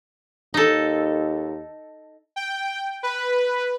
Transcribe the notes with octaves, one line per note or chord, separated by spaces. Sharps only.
D#2 D#4 A4
G5
B4